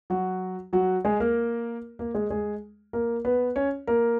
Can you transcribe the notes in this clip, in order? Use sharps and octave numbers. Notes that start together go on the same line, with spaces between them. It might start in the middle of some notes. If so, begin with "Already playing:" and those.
F#3 F#4
F#3 F#4
G#3 G#4
A#3 A#4
A#3 A#4
G#3 G#4
G#3 G#4
A#3 A#4
B3 B4
C#4 C#5
A#3 A#4